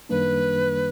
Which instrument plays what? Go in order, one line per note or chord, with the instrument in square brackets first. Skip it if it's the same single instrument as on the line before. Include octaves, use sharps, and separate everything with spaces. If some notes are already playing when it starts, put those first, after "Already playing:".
[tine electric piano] F#2 D#3 G3 A#3 D4 [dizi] B4